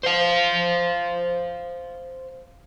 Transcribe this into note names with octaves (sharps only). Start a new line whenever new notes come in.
C5 F5